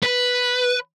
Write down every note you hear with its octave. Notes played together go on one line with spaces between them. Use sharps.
B4